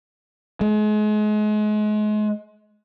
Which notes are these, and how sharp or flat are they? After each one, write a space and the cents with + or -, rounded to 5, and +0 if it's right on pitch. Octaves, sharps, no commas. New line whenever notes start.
G#3 +35